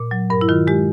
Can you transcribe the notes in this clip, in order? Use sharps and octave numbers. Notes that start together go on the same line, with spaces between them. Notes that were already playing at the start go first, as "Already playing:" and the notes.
Already playing: A#2
F#3
G2 A#4
E4
D#3 F4
G#3 G4